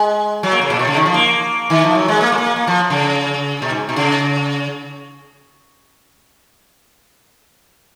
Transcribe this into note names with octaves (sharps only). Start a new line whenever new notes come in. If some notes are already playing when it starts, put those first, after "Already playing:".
Already playing: G#3
F#3
A#3
C#3
A#2
B2
C#3
D#3
F3
A#3
D#3
F3
F#3
G#3
A#3
G#3
A#3
A#3
F3
C#3
B2
G#2
B2
C#3